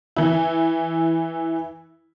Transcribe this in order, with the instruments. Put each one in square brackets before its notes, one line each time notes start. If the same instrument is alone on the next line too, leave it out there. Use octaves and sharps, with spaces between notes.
[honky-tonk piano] E3 E4